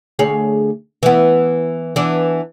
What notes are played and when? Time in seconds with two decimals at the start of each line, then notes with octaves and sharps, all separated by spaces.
0.19 D2 G#4 C#5
1.03 E3 B3
1.96 E3 B3 D4